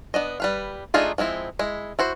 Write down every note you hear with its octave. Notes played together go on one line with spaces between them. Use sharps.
B3 D4 D#5
G3 B4 F5
A3 D4 D#4 F4 G#4
F3 G#3 C4 E4
G#3 E4
E4 F#4 C5